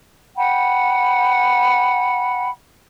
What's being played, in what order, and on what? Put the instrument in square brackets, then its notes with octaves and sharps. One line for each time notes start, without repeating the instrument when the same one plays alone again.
[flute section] F#5 G5 B5